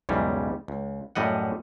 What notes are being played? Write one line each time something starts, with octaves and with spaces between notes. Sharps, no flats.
B1 E2 G#2 C#3 G3
C#2
F#2 A2 G3 D#5 F#5